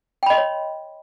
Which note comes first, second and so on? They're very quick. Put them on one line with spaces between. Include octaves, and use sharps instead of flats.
G5 B5 D#5 C6 C#5